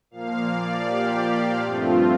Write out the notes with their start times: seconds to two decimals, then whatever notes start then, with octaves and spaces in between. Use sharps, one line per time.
0.11 A#2 F3 A#3 F5
0.48 D5
0.85 G4
1.60 G2 F3 A3 C4 F4